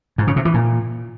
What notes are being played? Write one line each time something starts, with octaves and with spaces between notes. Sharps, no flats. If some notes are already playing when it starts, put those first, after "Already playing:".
G#2
C#3
C3
E3
A#2